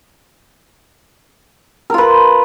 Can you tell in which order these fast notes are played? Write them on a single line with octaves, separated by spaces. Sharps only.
A#4 F4 B4